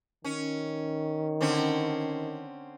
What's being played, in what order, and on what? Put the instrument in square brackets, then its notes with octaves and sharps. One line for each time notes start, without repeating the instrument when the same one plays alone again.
[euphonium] D#3 [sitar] C#4
[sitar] D3 C4 C#4